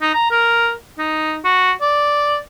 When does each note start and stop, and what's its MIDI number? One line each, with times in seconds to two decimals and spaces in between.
0.01 0.11 63
0.14 0.29 82
0.31 0.72 70
0.99 1.38 63
1.45 1.72 66
1.82 2.38 74